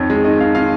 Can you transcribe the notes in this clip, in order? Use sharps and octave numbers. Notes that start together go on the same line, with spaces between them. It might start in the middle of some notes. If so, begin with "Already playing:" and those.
Already playing: F2 D#3 C#5
G#3
D#3 D#5
D#3 F5
D#3 F5